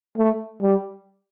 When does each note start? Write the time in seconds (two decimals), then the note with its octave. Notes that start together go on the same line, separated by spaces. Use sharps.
0.18 A3
0.62 G3